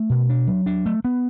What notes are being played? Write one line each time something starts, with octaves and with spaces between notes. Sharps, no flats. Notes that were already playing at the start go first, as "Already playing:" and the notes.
Already playing: A3
B2
D4
F#3
D4
A3
B3